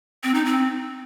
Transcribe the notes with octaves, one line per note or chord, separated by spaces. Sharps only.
C4
D#4
C4